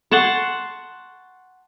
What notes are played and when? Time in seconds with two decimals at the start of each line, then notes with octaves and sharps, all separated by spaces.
0.11 F#5 A5 C6 C#6